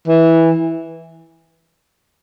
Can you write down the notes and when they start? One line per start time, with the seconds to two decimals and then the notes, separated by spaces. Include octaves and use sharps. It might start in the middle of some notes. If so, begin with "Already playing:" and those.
0.08 E3